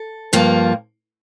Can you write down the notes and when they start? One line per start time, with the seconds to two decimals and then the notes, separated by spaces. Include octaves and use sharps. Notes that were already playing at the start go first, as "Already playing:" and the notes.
Already playing: A4
0.33 G2 F3 A#3